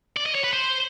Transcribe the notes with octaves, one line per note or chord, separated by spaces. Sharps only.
D5
D#5
C#5
B4
C5